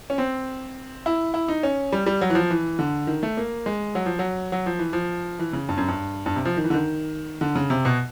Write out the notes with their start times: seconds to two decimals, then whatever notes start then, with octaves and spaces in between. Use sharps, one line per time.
0.10 C#4
0.18 C4
1.06 E4
1.34 E4
1.48 D#4
1.63 C#4
1.93 G3
2.06 G3
2.21 F#3
2.30 E3
2.35 F3
2.50 E3
2.79 D3
3.07 D#3
3.23 A3
3.37 A#3
3.66 G#3
3.95 F#3
4.06 F3
4.19 F#3
4.52 F#3
4.66 F3
4.79 E3
4.93 F3
5.39 E3
5.53 C#3
5.69 G2
5.77 F#2
5.88 G2
6.26 G2
6.36 C3
6.45 F3
6.57 D#3
6.64 E3
6.70 D3
6.74 D#3
7.41 D3
7.55 C#3
7.70 C3
7.85 B2